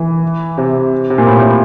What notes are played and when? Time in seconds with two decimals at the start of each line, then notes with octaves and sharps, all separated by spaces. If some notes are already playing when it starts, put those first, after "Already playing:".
Already playing: E3
0.58 C3
1.10 C3
1.18 A#2
1.27 A2
1.38 A2